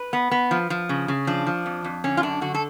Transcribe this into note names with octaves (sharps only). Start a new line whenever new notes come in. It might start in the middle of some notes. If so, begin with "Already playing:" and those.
Already playing: B4
B3
B3
F3
F3
C#3
C#3
F3 D4
F3
F2
F2
D3 C#4
F4
F#2 D4
D3 F#4
A4